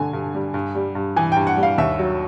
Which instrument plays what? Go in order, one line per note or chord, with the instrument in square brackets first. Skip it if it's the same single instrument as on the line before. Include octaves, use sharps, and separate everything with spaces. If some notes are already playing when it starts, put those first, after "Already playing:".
Already playing: [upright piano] G2 D3 G#5 A5
G2
G3
G2
G3
G2
E3 G#5
G2 G5
F#5
G3
F5
D#2 E5
F#3